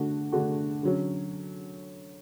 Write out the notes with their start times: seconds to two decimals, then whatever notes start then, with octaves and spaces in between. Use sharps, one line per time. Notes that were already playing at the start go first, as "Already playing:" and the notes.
Already playing: D3 A3 D4 F#4
0.32 D3 A3 D4 F#4
0.83 D3 F#3 C#4